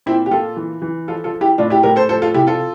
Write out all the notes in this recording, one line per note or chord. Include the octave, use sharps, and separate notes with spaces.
A#2 C4 E4
G4
A#2 F4 A4
E3
E3
F3 F4 A4
F4 A4
F3
E4 G4
A2 D4 F4
E4 G4
A2 G4 A#4
A4 C5
F3 A4 C5
F4 A4
C3 E4 G4
F4 A4